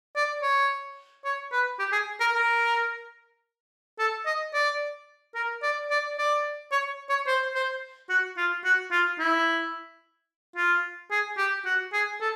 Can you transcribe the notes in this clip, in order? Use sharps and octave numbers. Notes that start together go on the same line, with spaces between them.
D5
C#5
C#5
B4
G4
G#4
A#4
A#4
A4
D#5
D5
A#4
D5
D5
D5
C#5
C#5
C5
C5
F#4
F4
F#4
F4
E4
F4
G#4
G4
F#4
G#4
A4